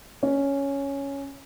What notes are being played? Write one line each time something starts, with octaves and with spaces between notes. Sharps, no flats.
C#4